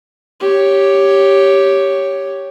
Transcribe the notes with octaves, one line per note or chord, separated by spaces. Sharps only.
G4 C#5